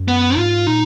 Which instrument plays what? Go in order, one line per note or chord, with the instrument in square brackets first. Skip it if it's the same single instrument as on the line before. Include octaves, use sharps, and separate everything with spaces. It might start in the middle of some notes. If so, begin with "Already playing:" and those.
Already playing: [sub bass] F#2
[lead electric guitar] B3
[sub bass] G#2 [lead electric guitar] F4
[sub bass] A#2 [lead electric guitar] D#4